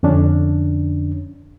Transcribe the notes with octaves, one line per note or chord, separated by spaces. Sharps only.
F2 D3 C#4 D4